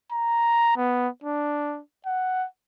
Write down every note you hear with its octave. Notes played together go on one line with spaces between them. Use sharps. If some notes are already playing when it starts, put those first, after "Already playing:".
A#5
B3
D4
F#5